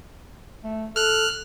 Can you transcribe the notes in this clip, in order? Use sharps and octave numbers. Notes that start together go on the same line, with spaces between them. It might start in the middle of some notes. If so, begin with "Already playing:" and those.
A3
A4 F6 F#6